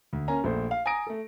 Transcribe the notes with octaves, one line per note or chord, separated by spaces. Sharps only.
D2
A#3 C#4 G#5 A#5
A#1 A3 C5
F5
G#5 A#5 D#6 A#6 D7
A3 A4